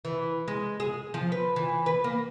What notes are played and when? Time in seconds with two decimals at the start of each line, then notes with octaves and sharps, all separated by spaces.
0.05 E3
0.48 G#3
0.80 G#4
1.14 F3
1.32 B4
1.56 E3
1.86 B4
2.04 A#3